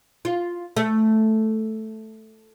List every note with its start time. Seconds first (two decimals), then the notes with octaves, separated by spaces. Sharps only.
0.25 F4
0.77 A3